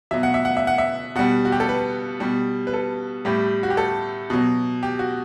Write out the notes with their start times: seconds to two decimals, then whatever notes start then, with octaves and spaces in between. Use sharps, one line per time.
0.11 B2 F#3 E5
0.23 F#5
0.34 E5
0.45 F#5
0.57 E5
0.67 F#5
0.78 E5
1.15 B2 G3 F#5
1.45 F#4
1.52 G4
1.60 A4
1.69 B4
2.20 B2 G3
2.67 B4
2.73 A4
3.25 A2 G3 G4
3.63 F#4
3.70 G4
3.77 A4
4.30 B2 F#3
4.83 G4
4.99 F#4